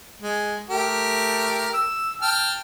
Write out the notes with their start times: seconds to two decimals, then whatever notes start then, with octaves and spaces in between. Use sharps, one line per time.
0.23 G#3
0.70 A3 G4 A#4
1.74 E6
2.22 G5 A5 F6